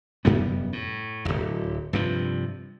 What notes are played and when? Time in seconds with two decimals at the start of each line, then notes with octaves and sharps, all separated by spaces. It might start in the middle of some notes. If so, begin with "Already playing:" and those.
0.25 F1 F#2 G3 B3
0.73 A2
1.25 D1 G1
1.93 G2 C3 F3